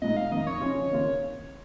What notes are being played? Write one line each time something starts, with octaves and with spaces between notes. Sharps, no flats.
A#2 G#3 D#4 D#5
F5
F2 D#3 A#3 D#4 D#5
C#5
C#3 F3 C#4 F4
D#3 A#3 F4